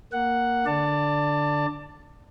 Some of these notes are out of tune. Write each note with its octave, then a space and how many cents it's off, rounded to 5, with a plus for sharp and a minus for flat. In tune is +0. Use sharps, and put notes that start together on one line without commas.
A#3 +0 F#5 +0
D3 -5 D5 +0 A5 +20